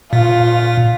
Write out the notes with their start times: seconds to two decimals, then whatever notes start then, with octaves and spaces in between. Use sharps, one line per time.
0.13 A#2 F4